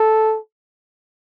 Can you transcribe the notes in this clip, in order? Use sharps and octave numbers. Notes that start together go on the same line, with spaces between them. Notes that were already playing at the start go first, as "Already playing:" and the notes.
Already playing: A4